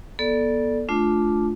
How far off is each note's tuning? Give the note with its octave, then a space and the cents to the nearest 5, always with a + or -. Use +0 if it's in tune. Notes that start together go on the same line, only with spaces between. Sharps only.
B3 -30 A4 +0 D5 +0
A3 -20 D4 +0 F4 +0